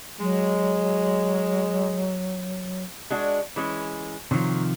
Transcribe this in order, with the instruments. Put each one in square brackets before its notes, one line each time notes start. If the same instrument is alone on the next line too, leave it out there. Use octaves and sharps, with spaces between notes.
[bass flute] F#3 [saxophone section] G#3
[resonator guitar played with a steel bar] G#3 D4 F#4
E3 G#3 C#4
[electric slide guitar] C3 D#3 F3 [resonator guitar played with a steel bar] F#3